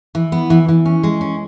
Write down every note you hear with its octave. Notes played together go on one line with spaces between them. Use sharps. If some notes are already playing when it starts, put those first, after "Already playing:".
E3
B3
E3
E3
C#4
G#3
C#4